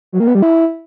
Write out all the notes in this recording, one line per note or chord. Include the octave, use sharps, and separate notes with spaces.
F#3
A#3
B3
G3
E4